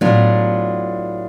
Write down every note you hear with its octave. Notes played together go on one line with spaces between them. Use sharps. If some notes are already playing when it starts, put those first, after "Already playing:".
A2 F#3 B3 D4 F4